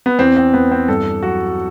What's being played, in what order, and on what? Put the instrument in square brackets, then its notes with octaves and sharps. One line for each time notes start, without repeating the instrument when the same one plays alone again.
[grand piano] B3
E2 C4
C4
E2 B3
C4
G2 A4
F#3 F#4